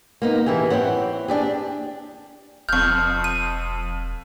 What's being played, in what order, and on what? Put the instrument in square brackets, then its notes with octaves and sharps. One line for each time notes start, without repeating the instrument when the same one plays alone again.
[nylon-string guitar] A#3 B3 D#4
E3 E4 G4 G#4
C4 E4 C#5 F#5
D4 G4 G#4
[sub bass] E1 [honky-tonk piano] F2 F6 [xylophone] C#6 G6
[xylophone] D#7